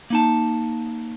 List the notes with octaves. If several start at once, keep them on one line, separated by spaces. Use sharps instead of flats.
A#3 D#4 A5